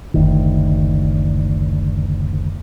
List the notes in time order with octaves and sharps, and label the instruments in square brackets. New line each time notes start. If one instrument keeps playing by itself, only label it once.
[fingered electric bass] F#1 D2 D#3